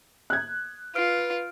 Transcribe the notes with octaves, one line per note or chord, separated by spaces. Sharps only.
F#6 G#6
F4 B4 F6 D7